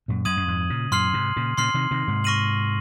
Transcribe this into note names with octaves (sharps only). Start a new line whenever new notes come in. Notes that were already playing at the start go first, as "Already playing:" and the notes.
F#2 A#2
F#2 D#6 G#6 D#7 F#7
F#2
F2 G#2
A#2 C#3
F#2 A#2 C6 F6 C7 F#7
G#2 C3
A#2 C#3
A#2 C#3 C6 F6 C7 F#7
C3 D#3
C3 D#3
G#2 C3
C#6 F6 A#6 D#7 F#7